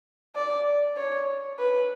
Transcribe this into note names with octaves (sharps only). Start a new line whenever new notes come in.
D5
C#5
B4